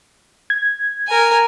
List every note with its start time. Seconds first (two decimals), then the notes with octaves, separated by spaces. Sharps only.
0.50 G#6
1.08 A#4 G#5